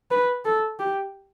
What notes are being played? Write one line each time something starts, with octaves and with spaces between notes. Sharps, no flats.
B4
A4
G4